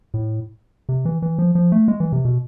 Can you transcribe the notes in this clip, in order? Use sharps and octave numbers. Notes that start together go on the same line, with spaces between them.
A2
C3
E3
E3
F3
F3
A3
G#3
E3
C3
B2